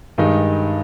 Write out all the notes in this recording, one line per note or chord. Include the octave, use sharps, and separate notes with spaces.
G2 D#3 G#3 D#4